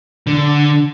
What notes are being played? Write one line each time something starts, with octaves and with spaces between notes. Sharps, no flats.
D3